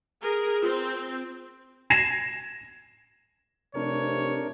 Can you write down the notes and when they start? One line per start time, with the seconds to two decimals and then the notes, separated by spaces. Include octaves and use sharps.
0.20 G#4 A#4
0.62 C4 F4
1.90 G#6 A#6 C7 E7
3.75 F1 C3 D4 A#4 C#5